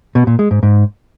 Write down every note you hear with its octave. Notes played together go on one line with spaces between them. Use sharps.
B2
A#2
G#3
G#2
G#2